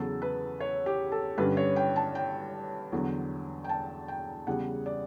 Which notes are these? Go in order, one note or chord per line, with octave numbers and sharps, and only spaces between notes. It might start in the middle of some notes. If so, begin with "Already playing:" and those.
Already playing: E2 C#3 F#3 A4
B4
C#5
G4
A4
G2 D3 G3 C#4 B4
C#5
G5
A5
G5
E2 D3 F#3
G5
A5
G5
E2 C#3 G3 F#5
D5